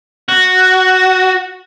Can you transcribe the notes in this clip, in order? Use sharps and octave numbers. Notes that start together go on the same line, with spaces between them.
F#4